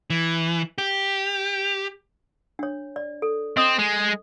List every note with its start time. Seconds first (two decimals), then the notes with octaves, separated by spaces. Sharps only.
0.10 E3
0.78 G4
2.59 D4 C#5
2.96 D5
3.22 A4
3.57 C4 D#5 D#6
3.79 G#3